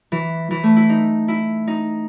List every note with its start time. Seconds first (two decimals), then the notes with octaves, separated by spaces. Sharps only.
0.12 E3
0.51 E3
0.63 A3
0.76 E4
0.89 D#4
1.28 E4
1.67 D#4